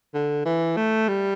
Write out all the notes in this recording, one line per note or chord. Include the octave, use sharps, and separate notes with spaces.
D3
E3
A3
G3